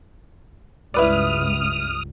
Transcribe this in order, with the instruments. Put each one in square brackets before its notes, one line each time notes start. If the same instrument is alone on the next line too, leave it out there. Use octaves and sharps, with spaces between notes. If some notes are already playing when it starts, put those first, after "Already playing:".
[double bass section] C#2 G2 [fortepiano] E4 B4 D5 [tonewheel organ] D#6 F6